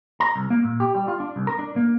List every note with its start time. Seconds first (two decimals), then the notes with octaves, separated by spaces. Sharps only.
0.20 A#5
0.36 C2
0.50 A#3
0.64 A#2
0.80 G4
0.95 G3
1.08 F4
1.20 D4
1.36 C2
1.47 A#4
1.59 D4
1.76 A#3